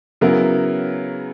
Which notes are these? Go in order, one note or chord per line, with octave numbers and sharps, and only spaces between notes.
C#3 F#3 B3 E4 A#4